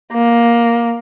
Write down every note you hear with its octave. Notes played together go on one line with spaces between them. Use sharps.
A#3